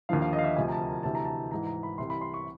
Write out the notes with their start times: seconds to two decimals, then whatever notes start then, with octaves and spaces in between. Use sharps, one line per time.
0.09 D#2 D3 F3 F5
0.22 F5
0.33 D#5
0.38 F5
0.44 E5
0.56 D2 C3 F3 G#5
0.68 A#5
0.72 A5
0.87 A#5
1.03 D2 C3 E3 A5
1.15 A#5
1.25 A5
1.51 G#2 E3 A#5
1.67 A#5
1.83 B5
1.98 C2 C3 E3 C6
2.10 B5
2.21 C6
2.34 C#6